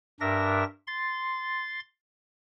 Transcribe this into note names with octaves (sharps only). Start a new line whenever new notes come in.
G2 D4 A#4 E5 A#6
C6 A6